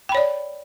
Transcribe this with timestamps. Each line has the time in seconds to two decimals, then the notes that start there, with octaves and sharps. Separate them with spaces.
0.09 G5
0.12 B5
0.15 C#5
0.17 D5